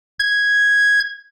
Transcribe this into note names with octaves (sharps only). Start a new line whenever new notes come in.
G#6